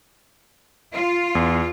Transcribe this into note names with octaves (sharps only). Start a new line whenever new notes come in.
F4
E2